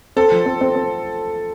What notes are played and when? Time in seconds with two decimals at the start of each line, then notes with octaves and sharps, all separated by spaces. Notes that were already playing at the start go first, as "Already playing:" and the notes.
0.16 C4 A4
0.32 F3
0.46 C4
0.61 C4
0.75 C4